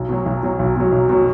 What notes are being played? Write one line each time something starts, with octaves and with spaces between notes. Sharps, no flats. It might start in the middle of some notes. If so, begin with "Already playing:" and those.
Already playing: B1
B2 F#3
B1
B2 F#3
B1
B2 F#3
B1
B2 F#3